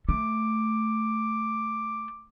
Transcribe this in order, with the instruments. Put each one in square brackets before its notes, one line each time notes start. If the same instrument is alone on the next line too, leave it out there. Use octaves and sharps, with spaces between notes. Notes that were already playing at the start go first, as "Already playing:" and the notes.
[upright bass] A3 [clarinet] D6